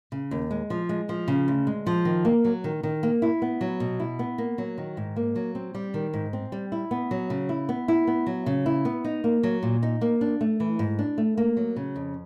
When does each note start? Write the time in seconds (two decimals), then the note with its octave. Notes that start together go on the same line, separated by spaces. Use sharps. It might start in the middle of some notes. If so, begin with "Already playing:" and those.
0.12 C#3
0.31 D#2
0.51 G#3
0.70 F3
0.89 G#3
1.09 F3
1.28 C#3
1.48 D2
1.67 G#3
1.87 F3
2.05 D#3
2.25 A#3
2.45 F#3
2.64 D#3
2.83 D#3
3.03 A#3
3.22 E4
3.42 B3
3.61 F#3
3.80 B2
4.00 E4
4.19 B3
4.38 A#3
4.58 F#3
4.78 D#3
4.97 G#2
5.16 A#3
5.36 F#3
5.55 C4
5.75 G3
5.94 D#3
6.14 G#2
6.33 C4
6.52 G3
6.72 E4
6.91 B3
7.11 F#3
7.30 C#3
7.49 E4
7.69 B3
7.88 E4
8.07 B3
8.27 F#3
8.46 C#3
8.66 E4
8.85 B3
9.04 D#4
9.24 A#3
9.43 F#3
9.63 A#2
9.83 D#4
10.01 A#3
10.21 D4
10.41 A3
10.60 E3
10.79 G#2
10.99 D4
11.18 A3
11.37 A#3
11.57 F#3
11.76 C#3
11.96 F2